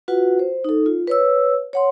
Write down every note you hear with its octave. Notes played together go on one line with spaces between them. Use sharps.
F4 F#4 B4 F#5
C5
D#4 A4
F4
B4 C#5 E6
C#5 F#5 C6